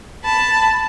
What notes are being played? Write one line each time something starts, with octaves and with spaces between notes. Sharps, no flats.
A5 B5